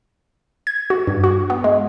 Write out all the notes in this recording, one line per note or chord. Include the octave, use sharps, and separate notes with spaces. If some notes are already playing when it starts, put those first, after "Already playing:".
G#6
F#4
G2
F#4
B3
G#3